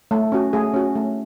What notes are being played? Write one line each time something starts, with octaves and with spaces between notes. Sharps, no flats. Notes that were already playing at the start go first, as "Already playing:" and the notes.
A3
C#4 F#4
A3 G#4
C#4 F#4
A3